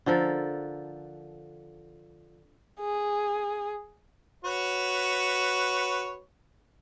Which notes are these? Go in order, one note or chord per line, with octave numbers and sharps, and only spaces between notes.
D3 F3 A4 A#4
G#4
F#4 B4 C#5